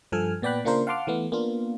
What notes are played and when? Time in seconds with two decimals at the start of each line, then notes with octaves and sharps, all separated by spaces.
0.12 G2 F3 A4 G#5 F6
0.42 A#2 B3 D5 G5 B5 F#6
0.65 C#3 A#3 D4 F4 A#4 C5
0.87 F5 F#5 A5 C6 D6 F6
1.07 E3 A3 B3
1.32 A#3 B3 D4 F4